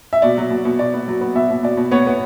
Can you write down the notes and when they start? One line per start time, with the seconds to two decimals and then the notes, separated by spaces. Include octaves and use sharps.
0.13 E5
0.22 B2 D5
0.37 F#3
0.50 B2
0.65 B2
0.79 B2 D5
0.94 B3
1.08 F#3
1.21 B3
1.35 B2 E5
1.50 B2
1.63 B2 D5
1.77 B2
1.91 B3 C#5
2.07 B3